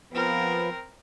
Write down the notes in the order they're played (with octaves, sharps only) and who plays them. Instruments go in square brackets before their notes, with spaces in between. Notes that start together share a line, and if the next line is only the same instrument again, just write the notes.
[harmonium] F3 B3 [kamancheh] C4 A#4